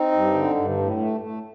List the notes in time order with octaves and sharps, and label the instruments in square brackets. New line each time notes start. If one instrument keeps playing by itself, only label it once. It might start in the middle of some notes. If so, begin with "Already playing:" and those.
Already playing: [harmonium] C4 D#4
G2
D3
G2
A2
A3
A3